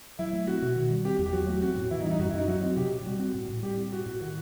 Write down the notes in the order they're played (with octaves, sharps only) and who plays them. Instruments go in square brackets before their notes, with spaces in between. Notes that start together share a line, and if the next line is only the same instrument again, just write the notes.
[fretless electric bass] F#3 [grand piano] E4
[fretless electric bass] A3
[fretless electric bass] C4 [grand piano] F#4
[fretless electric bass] B2
D#3
G3
[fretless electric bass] C4 [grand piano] G4
[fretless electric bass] E2
[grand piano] G4
[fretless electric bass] F#3 [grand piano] F#4
[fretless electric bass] A3
[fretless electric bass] C4 [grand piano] F#4
[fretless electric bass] A2
[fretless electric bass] E3 [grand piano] E4
[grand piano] D#4
[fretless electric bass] G3
[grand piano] D#4
[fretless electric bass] F#2 [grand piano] F#4
[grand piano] E4
[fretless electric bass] F#2 [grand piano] D#4
[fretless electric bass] F#3 [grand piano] F#4
[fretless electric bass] C4
[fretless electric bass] C3 [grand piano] G4
[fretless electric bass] C3
[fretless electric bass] G3 [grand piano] F#4
[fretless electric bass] C4
A2
A2
[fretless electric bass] G3 [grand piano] G4
[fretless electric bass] C4
[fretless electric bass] A2 [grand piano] F#4
[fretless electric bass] A2
[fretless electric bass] D#3 [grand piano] F#4